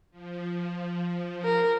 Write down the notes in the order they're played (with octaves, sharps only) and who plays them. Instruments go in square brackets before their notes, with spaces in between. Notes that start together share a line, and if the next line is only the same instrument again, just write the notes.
[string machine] F3
[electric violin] A#4